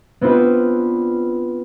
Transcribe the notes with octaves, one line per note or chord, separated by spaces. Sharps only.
B3 C4 D4 F4 B4